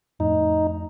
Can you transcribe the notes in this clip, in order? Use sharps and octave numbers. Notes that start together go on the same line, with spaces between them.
F2 A2 D#4